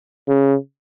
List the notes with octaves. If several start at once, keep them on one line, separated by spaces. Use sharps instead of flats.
C#3